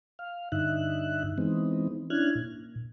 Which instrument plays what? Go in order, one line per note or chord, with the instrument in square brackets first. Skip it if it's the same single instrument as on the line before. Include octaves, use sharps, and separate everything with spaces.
[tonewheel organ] F5
G2 D3 D#4 E5 F#6
E3 G#3 B3 C4 D#4
C#4 D4 E4 F6 F#6 G#6
A#2